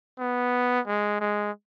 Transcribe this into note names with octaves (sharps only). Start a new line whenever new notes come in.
B3
G#3
G#3